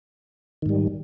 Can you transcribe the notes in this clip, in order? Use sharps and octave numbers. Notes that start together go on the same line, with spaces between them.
G#2 D#3 G3